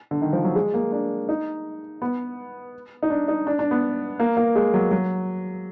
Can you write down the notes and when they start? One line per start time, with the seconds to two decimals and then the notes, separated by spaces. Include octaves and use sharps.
0.11 D3
0.22 D#3
0.33 F3
0.44 F#3
0.55 G#3
0.74 A#3
0.92 D4
1.29 D#4
2.02 B3
3.03 D#4
3.10 D4
3.28 D#4
3.47 D4
3.59 D4
3.71 B3
4.20 A#3
4.37 A#3
4.56 G#3
4.74 F#3
4.91 F#3